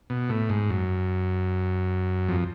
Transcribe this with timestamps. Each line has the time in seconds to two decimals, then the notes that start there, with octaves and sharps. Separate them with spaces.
0.10 B2
0.29 A2
0.50 G#2
0.70 F#2
2.28 F2